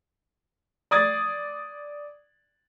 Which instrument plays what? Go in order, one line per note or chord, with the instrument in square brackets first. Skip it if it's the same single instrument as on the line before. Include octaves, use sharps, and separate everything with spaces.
[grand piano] D5 D#6 G#6 A6